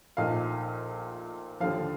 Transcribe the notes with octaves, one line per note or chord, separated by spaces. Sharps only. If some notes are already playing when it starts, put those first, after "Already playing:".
A#1 A#2 A3 D#4 F5
D#2 D3 F3 F5